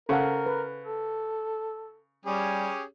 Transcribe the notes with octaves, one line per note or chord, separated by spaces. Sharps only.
C#3 A4 A#4 C5 F#5
B4
A4
G3 C#4 G4 G#4